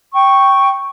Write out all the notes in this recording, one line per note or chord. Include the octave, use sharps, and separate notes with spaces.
G5 C#6